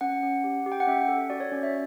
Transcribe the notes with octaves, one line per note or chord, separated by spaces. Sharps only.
C#4 F#5
C#4
G4
G4
G5
F#5
C#4 E5
A4
F#4 D5
C#5
C#4 D5
E5